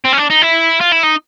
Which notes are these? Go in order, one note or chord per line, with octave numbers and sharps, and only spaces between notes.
C4
C#4
D4
D#4
E4
F4
E4
D#4